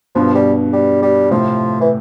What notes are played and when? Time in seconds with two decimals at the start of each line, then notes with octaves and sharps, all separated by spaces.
0.15 G2 B2 F3
0.35 G3
0.73 G3
1.02 G3
1.31 A2 C3 F3
1.81 E3